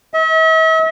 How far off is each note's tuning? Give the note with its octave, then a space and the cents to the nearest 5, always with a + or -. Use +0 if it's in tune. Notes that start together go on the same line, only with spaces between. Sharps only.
E5 -45